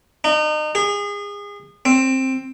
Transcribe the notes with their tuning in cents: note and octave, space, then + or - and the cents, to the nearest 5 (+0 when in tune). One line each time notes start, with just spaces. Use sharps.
D#4 -35
G#4 -30
C4 +10